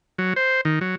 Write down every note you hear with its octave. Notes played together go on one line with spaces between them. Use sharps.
F#3
C5
D#3
F#3